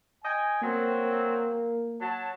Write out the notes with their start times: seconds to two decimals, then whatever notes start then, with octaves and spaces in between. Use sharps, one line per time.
0.24 D#5 G5 G#5
0.62 F#3 A#3 C4
2.01 F#3 A5